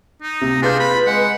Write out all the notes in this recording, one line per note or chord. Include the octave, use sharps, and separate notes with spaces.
D#4
C3 A#3
D4 F4 G#4 B4 G6
B5
G#3 F#5